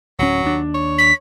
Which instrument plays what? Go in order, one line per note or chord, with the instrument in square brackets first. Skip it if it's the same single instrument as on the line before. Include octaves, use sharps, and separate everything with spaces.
[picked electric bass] D1 C#4 [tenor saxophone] F#3
[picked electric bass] D#2 D4
[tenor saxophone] C#5
[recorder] B6